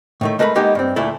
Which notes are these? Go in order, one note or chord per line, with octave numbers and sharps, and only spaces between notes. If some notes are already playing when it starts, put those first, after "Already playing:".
A2 D#3 A3
G#3 A3 A#4 B4 B5
G#3 A#3 B3 D#4 G4
G2 C4
D2 A#2 A3 E4 A4